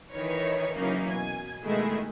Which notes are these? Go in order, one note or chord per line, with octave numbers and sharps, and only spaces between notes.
D#3 E3 D#4 B4 C#5
C#3 E3 F#3 A#3 C#4 D#4
B2 G#5
B2 D#3 G#3 A3 E4 G#4